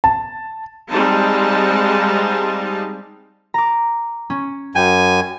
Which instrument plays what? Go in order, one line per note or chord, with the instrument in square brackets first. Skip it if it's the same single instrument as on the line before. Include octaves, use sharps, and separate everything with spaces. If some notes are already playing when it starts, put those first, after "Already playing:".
[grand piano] A5
[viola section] G3 G#3 C4 D#4 F5 A5
[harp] A#5 D6
C#4
[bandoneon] F#2 G#5 [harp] G5